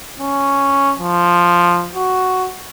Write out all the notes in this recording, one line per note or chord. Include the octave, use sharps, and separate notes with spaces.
C#4
F3
F#4